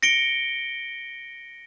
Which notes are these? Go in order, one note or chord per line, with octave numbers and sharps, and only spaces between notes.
A#6 C#7 D7 G7